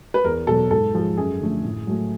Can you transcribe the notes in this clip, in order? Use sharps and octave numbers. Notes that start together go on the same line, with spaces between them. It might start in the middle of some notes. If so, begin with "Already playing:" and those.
B4
E2 A#4
B2 F#3 A4
G#2 A4
F3 G#3
F#2 G#4
D3 F3 A3
A2
F#3 A3